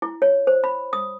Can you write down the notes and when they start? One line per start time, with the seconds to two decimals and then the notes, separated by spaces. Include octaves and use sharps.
0.02 E4
0.22 C#5
0.47 C5
0.64 B5
0.93 D#6